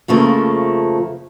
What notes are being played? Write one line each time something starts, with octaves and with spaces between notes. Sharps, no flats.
F2 C#3 F3 A3 A#3